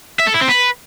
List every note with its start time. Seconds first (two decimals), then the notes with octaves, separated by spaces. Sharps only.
0.19 E5
0.27 A4
0.34 E4
0.42 C4
0.49 B4